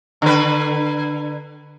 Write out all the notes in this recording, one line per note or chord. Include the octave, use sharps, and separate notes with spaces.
D3 B4